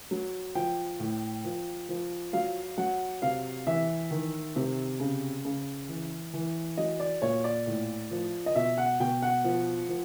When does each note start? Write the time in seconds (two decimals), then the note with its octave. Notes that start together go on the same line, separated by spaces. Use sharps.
0.11 F#3
0.55 F3 G5
1.00 A2
1.45 F3
1.89 F3
2.33 F#3 F5
2.78 F#3 F#5
3.22 C3 F5
3.67 E3 E5
4.11 D#3
4.56 C3
5.00 C#3
5.45 C#3
5.89 E3
6.33 E3
6.77 F#3 D#5
7.00 D5
7.22 A#2 C#5
7.44 D5
7.67 A2
8.11 F3
8.46 D#5
8.56 B2 E5
8.78 F#5
9.00 B2 G5
9.22 F#5
9.44 F3
9.89 F3